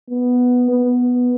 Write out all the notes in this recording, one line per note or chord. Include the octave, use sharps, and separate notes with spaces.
B3
B3